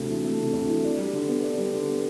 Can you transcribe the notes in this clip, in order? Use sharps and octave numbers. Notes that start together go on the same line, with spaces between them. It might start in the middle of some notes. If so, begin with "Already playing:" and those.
Already playing: D2 C3 A3
E3
A3
C3
D2
E3
D4
G3
D3
B3
D4
G3
D3
B3